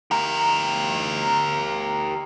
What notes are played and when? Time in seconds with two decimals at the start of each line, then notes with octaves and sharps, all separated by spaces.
0.11 G4 A#4